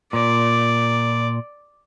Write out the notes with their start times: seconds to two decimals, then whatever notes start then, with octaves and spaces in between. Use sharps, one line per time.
0.13 A#2 D5